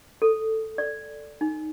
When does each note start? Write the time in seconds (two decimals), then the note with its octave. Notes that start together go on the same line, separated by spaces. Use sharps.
0.22 A4
0.78 D5
1.41 D#4